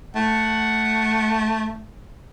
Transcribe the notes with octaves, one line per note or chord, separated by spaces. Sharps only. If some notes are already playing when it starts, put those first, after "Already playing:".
A3 F#5